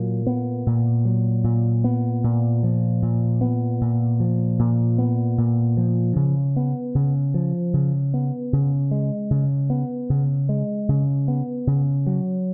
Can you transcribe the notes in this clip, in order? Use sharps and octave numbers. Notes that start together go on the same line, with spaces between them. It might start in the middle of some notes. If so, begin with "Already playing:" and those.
Already playing: A#2 F#3
B3
A#2
F#3
A#2
B3
A#2
F3
A#2
B3
A#2
F3
A#2
B3
A#2
F3
C#3
B3
C#3
F3
C#3
B3
C#3
G#3
C#3
B3
C#3
G#3
C#3
B3
C#3
F#3